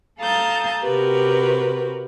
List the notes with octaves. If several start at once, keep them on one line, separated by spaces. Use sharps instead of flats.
A4 F5 A5 A#5 D#6 G6
C3 F#4 G4 A#4 B4